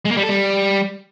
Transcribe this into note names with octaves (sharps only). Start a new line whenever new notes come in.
G#3
A#3
G3
A4
G3